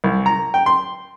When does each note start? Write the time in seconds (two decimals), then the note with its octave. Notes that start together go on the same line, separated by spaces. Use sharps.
0.04 C2
0.26 A#5
0.54 G5
0.66 C6